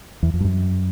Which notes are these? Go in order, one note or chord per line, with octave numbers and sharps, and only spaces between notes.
E2
F2
G2
F#2